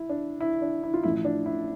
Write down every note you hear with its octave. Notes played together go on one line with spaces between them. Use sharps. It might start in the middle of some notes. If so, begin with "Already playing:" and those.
Already playing: E4
D4
E4
D4
E4
F4
A1 A2 F3 A3 E4
D4
E4